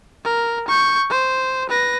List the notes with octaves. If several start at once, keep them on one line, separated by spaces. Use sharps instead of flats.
A#4
C#6 G6
C5
B4 A#6